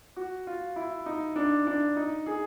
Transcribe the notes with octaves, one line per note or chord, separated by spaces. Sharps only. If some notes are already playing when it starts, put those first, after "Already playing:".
F#4
F4
E4
D#4
D4
D4
D#4
G#4